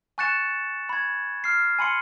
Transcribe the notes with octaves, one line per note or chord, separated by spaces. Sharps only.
G#5 C#6 F#6 A6 C#7 E7
B5 G#6
F6 C7
G#5 B5 C6 C#7